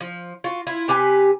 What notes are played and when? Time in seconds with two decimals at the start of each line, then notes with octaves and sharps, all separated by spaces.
0.01 F3
0.44 F4 F#4
0.67 E4 F4
0.88 C3 G4 B4 G#5